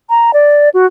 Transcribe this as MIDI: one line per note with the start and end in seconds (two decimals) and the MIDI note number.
0.10 0.31 82
0.33 0.69 74
0.74 0.86 66